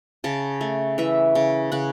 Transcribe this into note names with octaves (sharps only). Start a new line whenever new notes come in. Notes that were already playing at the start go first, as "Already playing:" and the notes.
C#3 A5
A3
E3 E5
C#3
C#3 F#5